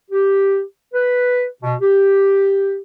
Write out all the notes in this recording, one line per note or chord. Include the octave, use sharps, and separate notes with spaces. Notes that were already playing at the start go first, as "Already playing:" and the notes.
G4
B4
B2
G4